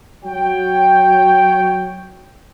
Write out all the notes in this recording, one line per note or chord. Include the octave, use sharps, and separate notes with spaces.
F#3 F#4 C#5 G5